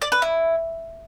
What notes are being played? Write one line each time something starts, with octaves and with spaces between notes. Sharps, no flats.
D5
B4
E4